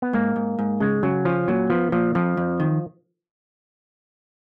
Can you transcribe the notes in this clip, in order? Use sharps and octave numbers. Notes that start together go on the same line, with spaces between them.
B3
G#2 A#3
G#2
G#2
C#3 G#3
C#3 F#3
F3 C#4
A#2 F#3
F3 B3
A#2 F3
F2 F3
F2
D#3